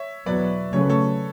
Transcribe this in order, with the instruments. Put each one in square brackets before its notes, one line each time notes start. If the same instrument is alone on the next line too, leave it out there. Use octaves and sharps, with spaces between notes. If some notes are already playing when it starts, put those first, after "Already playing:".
Already playing: [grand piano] C#5 E5
[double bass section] E2 B2 F#3 B3 [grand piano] B4 D5
[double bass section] C#3 F#3 A3 C#4 [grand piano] C#5
[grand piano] B4
A4 C#5